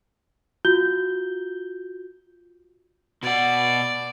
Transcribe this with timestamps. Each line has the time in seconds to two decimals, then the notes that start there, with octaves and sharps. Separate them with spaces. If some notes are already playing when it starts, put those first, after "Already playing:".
0.65 F4 F#4 G6 G7
3.23 B2 D5 F#5